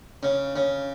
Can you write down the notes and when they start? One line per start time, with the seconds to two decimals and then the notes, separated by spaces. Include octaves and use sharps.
0.23 C#3
0.56 C#3